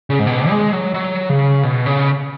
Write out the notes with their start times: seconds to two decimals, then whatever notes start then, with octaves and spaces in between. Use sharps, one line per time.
0.10 C#3
0.19 G#2
0.27 B2
0.49 G#3
0.72 F#3
0.94 F#3
1.29 C#3
1.63 B2
1.86 C#3